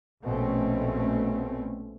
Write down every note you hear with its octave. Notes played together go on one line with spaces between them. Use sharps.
A#1 B2 A3 C4 C#4